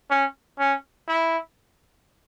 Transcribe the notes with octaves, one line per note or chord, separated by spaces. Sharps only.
C#4
C#4
E4